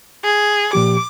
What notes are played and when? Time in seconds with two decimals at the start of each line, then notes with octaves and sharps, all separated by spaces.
0.24 G#4
0.73 A#2 F3 G4 D6